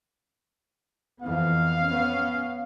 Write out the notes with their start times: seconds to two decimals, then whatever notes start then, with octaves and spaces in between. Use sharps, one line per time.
1.23 F2 E3 B3 F5
1.84 B3 C#4